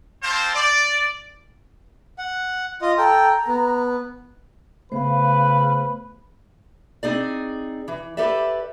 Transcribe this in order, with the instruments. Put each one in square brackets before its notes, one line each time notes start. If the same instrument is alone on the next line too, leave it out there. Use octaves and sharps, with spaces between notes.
[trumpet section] G3 C4 C5 F5 A5
D5
[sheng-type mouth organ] F#5
F4 D#5
[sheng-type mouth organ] A4 G5 [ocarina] A#5
[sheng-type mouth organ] B3
[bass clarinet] C#3 [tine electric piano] A3 B3 [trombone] B4 [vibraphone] C5 F5
[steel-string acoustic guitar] C4 D#4 G#4 D5
E3
G4 A4 B4 D5 E5